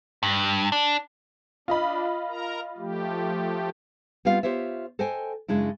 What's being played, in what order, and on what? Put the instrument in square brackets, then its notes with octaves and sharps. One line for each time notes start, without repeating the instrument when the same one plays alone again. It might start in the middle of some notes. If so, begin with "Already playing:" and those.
[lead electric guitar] G2
D4
[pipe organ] D4 [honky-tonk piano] F4 D#5 B5
[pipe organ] A#4 A#5
F3 A3 G4
[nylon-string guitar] G3 B3 C4 F4 F5
F4 G4 C5 C#5 E5
A4 C5 D#5 G5 G#5
F#2 C#3 G#3 D4 E4